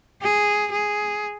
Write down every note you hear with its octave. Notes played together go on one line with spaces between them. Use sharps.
G#4
G#4